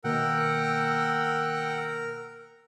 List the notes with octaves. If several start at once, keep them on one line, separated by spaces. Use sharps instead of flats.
B2 D#3 A#3 A#4 F#5 G5 E6